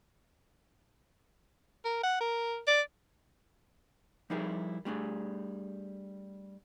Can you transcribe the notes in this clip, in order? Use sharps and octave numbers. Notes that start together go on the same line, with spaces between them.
A#4
F#5
A#4
D5
F3 G3 D#4 E4 G#4 A#4
G3 A3 D4 G#4